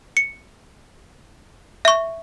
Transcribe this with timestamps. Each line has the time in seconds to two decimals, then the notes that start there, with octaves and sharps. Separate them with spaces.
0.17 C#7
1.85 E5 C#6